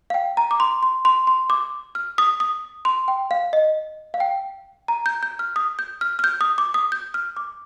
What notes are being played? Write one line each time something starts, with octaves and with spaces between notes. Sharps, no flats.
F5
G5
A#5
D6
C6
C6
C6
C6
D6
F6
D#6
D#6
C6
G5
F5
D#5
F5
G5
A#5
G6
G6
F6
D#6
G6
F6
F6
G6
D#6
D6
D#6
G6
F6
D6